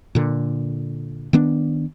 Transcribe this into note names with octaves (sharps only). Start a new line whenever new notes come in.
A#2 D3
D#3 B3 D4